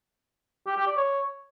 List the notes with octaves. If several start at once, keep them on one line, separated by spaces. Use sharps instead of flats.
G4
G4
D5
C#5